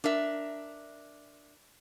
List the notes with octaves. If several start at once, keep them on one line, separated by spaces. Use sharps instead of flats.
D4 A#4 E5